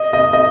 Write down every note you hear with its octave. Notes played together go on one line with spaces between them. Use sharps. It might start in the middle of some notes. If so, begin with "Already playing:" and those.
Already playing: D#5
D#5
D#5